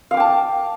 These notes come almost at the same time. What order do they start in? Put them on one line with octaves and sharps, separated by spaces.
F5 D6 G5 A5